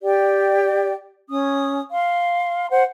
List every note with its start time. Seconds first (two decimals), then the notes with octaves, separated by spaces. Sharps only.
0.03 G4 D5 G5
1.29 C#4 D#6
1.91 F5 C6
2.70 C5 F#5